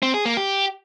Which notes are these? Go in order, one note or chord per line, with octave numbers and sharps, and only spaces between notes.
C4
G#4
A#3
G4